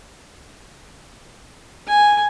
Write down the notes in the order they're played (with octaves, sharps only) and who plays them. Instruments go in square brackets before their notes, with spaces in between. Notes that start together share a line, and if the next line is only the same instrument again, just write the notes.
[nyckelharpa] G#5